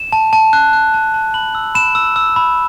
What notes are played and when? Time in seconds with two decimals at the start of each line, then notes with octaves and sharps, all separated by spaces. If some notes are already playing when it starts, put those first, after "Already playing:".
Already playing: E7
0.13 A5
0.33 A5
0.53 F#6
0.73 F#6
0.94 A5
1.14 A5
1.34 B5 F#7
1.55 E6
1.75 B5 E7
1.95 E6
2.16 E6
2.36 B5